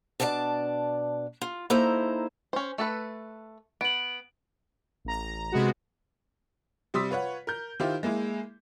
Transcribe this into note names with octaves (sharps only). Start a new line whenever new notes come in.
B2 D4 D5 D#5 A5
F4
A#3 D#4 E4 A4 C5 A#5
C#4 C5
A3 A4 B4
B3 D7 F#7
A1 A#5
C3 G#3 B3 F#4
C3 G3 C6 D#6 E6 B6
F4 B4 C#5 F#5
A#4 G6
D#3 E4 F4 G4 C5
G#3 A#3 E4 G#4